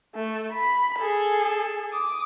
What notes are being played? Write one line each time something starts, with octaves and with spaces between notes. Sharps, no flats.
A3
B5
G#4 A4
D6 D#6